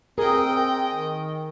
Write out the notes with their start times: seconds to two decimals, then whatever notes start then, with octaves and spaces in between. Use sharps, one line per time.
0.18 C4 G#4 A#4 D#5 G5
0.90 D#3